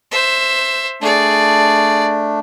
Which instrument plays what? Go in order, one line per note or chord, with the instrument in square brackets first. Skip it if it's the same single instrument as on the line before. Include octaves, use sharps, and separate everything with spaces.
[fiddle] C5 E5
[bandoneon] A3 D4 [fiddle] G#4 D5